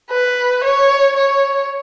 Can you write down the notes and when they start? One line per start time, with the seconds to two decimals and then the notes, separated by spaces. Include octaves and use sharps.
0.11 B4
0.64 C#5
1.17 C#5